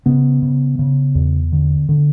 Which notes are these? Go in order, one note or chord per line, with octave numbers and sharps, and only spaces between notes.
C#3 B3
C#3
C#3
E2
D3
D3